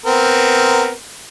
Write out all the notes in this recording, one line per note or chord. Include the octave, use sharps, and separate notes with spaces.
B3 C4 A#4